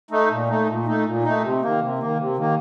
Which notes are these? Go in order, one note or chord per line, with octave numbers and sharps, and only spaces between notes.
A3 D#4
A#2
A3 D#4
A#2
A3 D#4
A#2
A3 D#4
C3
D#3 A#3
C3
D#3 A#3
C3
D#3 A#3